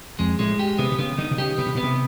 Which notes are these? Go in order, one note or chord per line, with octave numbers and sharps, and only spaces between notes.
F2 G#3
A2 G#3
G4
C3 B3
C3
C#3 B3
D3 D#4
C3
C#3 G4
C#3 B3
C3
B2 B3
C3